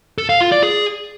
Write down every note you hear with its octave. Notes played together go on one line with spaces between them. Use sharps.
A4
F5
F4
D5
G#4